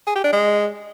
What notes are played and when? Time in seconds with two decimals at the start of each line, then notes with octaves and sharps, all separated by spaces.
0.07 G#4
0.16 G4
0.24 D4
0.33 G#3